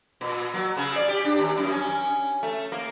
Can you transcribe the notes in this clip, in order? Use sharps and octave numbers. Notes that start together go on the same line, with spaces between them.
A#2
F#3
C#3
D5
G4
D4
D#2
F#2
C#4
A3
A#3